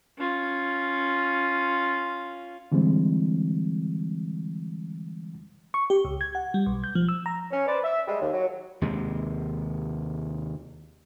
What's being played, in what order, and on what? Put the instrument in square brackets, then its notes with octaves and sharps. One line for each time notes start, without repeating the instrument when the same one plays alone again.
[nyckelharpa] C#4 F4
[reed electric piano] D3 E3 G3 G#3 C4
[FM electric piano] C#6
G4
C#2
G#6
F#5
G3
B1
G6
F3
E6
A#5
[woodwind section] C#4
B4 C5 D5
E5
G3 G#3
D#2
F#3
[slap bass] D#2 C3 G#3